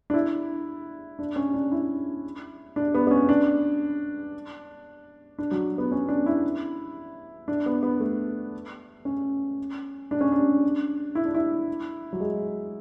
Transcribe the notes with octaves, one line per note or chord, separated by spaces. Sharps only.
D4
E4
D4
C#4
D4
E4
D4
B3
B3
C#4
D4
D4
F#3
B3
C#4
D4
E4
D4
B3
B3
A3
C#4
D4
C#4
D4
E4
D4
E4
F#3
G#3